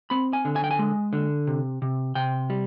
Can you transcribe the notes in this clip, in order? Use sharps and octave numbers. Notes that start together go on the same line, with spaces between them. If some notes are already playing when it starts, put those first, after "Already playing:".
C4 B5
G#5
D3
G#5
G5
G#5
G#3
D3
C3
C3
C3 G5
G3